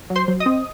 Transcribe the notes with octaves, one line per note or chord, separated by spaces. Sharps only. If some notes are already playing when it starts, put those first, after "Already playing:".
F#3
C5 C6
F#3
D#5 D#6
C4